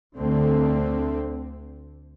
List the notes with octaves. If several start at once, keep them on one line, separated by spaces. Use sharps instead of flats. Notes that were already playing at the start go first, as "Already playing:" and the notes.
D2 D3 A3 C4